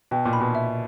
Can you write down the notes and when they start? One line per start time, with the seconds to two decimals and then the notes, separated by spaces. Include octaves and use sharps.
0.11 B2 G5
0.25 A#2
0.33 B5
0.41 B2
0.55 E5